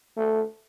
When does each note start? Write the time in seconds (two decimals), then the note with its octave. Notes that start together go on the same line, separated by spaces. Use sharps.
0.16 A3